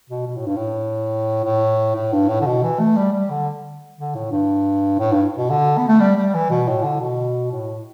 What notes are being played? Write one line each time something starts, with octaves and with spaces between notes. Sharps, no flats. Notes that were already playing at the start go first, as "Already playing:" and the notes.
B2
B2
A2
G2
A2
A2
A2
G2
A2
D3
B2
E3
A3
G3
G3
D3
D3
A2
G2
A2
G2
B2
D3
B3
A3
G3
G3
E3
B2
A2
D3
B2
A2